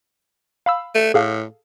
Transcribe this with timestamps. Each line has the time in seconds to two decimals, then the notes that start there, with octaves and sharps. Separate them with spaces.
0.66 F5 B5 E6
0.95 A3
1.14 A2 G#4 A4 F5